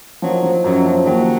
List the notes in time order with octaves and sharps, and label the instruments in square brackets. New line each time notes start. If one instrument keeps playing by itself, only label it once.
[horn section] D#3 F#3 [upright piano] F3
[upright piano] F3
[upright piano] F#2 [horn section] D#3 F#3
[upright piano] F3
[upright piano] D#2 [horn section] D#3 F#3